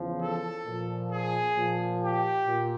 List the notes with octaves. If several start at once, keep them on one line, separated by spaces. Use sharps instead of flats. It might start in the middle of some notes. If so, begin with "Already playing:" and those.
Already playing: E2 C#3 F3
A4
A#2 F3
G#4
A#2 F3
G4
A#2